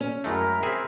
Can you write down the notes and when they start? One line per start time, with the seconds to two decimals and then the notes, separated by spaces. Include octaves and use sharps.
0.01 C#4
0.24 F#2 G#3 A3 E4 A#4
0.63 C4 G#4 E5